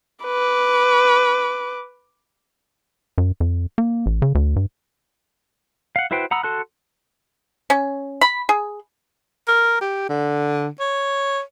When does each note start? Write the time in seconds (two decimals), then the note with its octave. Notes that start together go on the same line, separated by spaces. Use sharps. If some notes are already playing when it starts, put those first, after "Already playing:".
0.24 B4 D6
3.18 F#2
3.40 F2
3.78 A#3
4.06 A1
4.22 C#3
4.35 D2
4.56 G2
5.96 F5 F#5
6.11 E4 F#4 B4 C5 G5
6.31 F#5 A#5 B5 D#6 E6
6.43 F#4 A4 A5 C6 F#6
7.70 C#4
8.21 B5
8.49 G#4
9.48 A#4
9.81 G4
10.09 D3
10.80 C#5